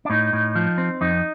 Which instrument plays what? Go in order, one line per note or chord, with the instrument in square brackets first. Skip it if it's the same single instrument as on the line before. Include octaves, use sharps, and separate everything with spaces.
[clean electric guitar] D4
A2 D#4
A2
F3
C4
F2 D#4